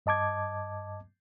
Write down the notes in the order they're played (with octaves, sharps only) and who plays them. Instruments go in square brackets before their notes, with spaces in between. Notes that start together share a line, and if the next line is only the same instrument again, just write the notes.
[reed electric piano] G2 D#5 A5 D6 G#6